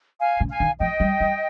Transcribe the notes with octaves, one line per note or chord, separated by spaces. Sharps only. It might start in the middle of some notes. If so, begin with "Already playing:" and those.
F5 G#5
C#3
F5 G#5
D#3
F3 D#5 G5
G3
G3